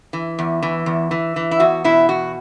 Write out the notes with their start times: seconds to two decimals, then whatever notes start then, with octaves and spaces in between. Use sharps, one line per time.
0.13 E3
0.39 E2
0.63 E3
0.86 E2
1.11 E3
1.36 E3
1.51 E4
1.60 E2 F#4
1.84 B2 E4
2.09 E2 F#4